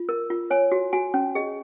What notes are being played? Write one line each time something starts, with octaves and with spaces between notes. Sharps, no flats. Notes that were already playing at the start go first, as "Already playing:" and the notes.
Already playing: F4
A#4
F4
C#5 G#5
F#4
F#4 G#5
C#4
G#4 D#5